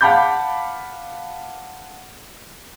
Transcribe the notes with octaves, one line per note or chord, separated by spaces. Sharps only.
F5 F#5 A5 B5 D6 G6